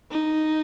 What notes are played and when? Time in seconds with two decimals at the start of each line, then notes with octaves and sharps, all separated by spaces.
0.11 D#4